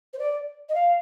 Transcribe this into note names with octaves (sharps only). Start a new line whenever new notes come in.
C5
D5
D#5
F5